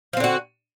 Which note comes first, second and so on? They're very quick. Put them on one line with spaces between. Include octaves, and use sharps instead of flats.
F3 C4 D3 F#4